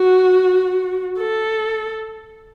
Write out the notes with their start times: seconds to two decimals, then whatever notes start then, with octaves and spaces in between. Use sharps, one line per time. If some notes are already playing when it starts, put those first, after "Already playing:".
Already playing: F#4
1.19 A4